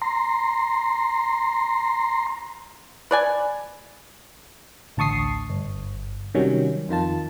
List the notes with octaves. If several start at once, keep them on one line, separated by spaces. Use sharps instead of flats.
A#5 C6
B4 D5 G#5
A1 D2 A5 C#6 D#6 C7
G1
C3 D#3 F#3 G3 C#4
F2 D#3 F4 A5